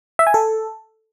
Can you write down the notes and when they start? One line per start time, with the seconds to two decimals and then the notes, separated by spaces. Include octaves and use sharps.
0.19 E5
0.27 G#5
0.34 A4